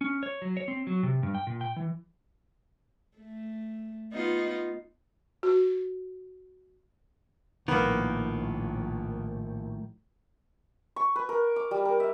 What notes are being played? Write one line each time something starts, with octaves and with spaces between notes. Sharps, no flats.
C#4
C#5
F#3
C#5
C4
F#3
C3
G2
G5
A#2
G5
E3
A3
B3 D#4 F4
F#4
A#1 A2 D#3 A#3 B3
C#6
B4
A#4
D6
G3
A#4
E5